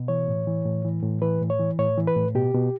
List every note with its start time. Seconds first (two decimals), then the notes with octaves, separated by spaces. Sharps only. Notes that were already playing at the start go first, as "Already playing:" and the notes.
Already playing: B2
0.08 E3 C#5
0.28 A2
0.47 E3
0.65 A2
0.85 E3
1.03 A2
1.22 E3 B4
1.42 A2
1.50 C#5
1.59 E3
1.79 A2 C#5
1.97 E3
2.07 B4
2.16 A2
2.35 B2 G4
2.54 B2